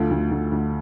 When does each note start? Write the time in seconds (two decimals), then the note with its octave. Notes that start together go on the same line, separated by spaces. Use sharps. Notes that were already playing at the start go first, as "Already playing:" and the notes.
Already playing: D2 F4 A4
0.11 D2
0.31 D2
0.52 D2